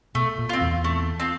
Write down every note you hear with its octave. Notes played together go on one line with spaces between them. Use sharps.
B2 A3
A#2
C4 F4
E2
A3
C4 F4